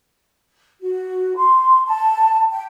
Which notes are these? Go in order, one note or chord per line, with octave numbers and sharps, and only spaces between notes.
F#4
C6
A5
G5